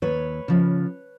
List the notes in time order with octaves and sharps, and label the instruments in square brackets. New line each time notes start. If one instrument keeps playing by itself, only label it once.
[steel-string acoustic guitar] D#2 B4 C#5
C#3 F3